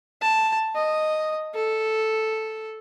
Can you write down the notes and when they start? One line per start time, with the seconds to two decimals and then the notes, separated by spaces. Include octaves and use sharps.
0.22 A5
0.75 D#5
1.55 A4